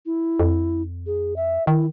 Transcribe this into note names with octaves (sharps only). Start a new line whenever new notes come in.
E4
F2
G#4
E5
D#3 E4